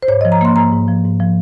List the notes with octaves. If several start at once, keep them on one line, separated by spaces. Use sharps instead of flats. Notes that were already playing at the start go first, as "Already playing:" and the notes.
C5
G#2 C#5
F3 D#5
A#5
A#3 C6
G#2 A#5
G#2
F3
G#2
F3